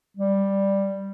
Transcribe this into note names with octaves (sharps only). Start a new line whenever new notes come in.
G3